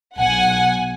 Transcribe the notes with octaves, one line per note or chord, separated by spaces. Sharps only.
B1 F#5 G#5